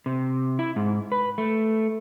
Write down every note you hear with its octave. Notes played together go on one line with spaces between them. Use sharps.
C3
E4
G#2
B4
A3